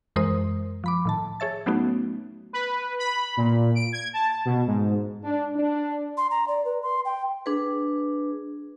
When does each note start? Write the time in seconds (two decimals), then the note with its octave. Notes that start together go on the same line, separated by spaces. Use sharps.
0.16 F#2 E3 G#3 A#4 C5 D#6
0.84 F3 B5 D6
1.05 A2 D#3 A5
1.40 G#4 C#5 E5 A6
1.66 F#3 A3 B3 C#4 D#4 F#4
2.53 B4
2.99 B5
3.37 A#2
3.75 D7
3.92 G#6
4.13 A5
4.45 B2
4.67 G#2
5.24 D4
5.56 D4
6.17 C6
6.31 A#5
6.48 D5
6.65 B4
6.82 C6
7.05 G5
7.46 D4 G#4 B4